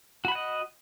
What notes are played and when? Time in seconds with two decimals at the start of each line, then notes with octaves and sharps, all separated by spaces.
0.25 F#4
0.28 B5
0.32 F#5
0.35 D#5